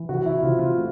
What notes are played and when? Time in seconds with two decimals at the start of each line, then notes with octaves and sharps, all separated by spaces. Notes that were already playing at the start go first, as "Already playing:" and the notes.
Already playing: E3
0.09 C3 F#4
0.26 E4
0.42 C3 F4
0.59 F4
0.76 A3